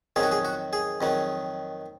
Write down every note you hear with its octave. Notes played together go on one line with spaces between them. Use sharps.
F2 D#3 F#3 G#4
F#4
G#4
F#4
G#4
F2 D#3 F#3